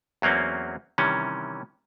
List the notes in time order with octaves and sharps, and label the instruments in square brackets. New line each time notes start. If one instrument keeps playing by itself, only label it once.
[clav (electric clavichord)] E2 F#3 A#3 C4 C#4
C3 D#3 E3 G3 C#4